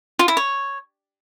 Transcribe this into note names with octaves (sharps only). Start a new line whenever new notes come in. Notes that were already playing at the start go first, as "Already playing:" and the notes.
F4
E4
C#5